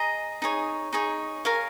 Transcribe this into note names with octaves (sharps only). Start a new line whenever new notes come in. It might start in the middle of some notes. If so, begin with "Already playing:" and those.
Already playing: G#4 D#5 A#5
D#4 G#4 C#5
D#4 G#4 C#5
A#4 C#5 F5 G#5